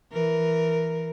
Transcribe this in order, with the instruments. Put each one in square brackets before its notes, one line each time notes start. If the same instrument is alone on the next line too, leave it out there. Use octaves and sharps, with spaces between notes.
[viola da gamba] E3 A#4